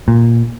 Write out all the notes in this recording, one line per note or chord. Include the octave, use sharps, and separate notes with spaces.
A#2